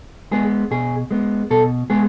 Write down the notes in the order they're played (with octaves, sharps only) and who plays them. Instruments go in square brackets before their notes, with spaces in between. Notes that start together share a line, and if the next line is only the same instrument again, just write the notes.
[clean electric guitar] G#3 B3 G#4
B2 G#4
G#3 B3
B2 A4
G#3 B3 G#4